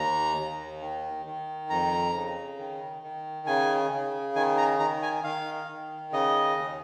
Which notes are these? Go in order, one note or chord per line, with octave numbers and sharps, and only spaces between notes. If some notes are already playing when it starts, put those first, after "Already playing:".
Already playing: D#2 A#5
D#2
D#3
D#3
F2 A#5
C#3
D#3
D#3
C#3 G#5
C#3
D#3 G#5
A#5
D#3 A#5
G#5
D#3 F5
D#3
C#3 D#5
D#2